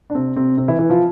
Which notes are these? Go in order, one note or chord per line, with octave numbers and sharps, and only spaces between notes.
D4
C3 C4
C3 C4
C3 C4
E3 E4
E3 E4
F3 F4